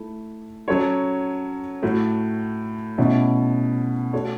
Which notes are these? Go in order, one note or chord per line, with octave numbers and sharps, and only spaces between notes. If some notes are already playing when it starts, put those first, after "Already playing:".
Already playing: A3 E4 A4
F#3 C#4 A4 C#5
A2 A3 F#4
B2 A3 C#4 E4 A4
A3 F#4 A4 C#5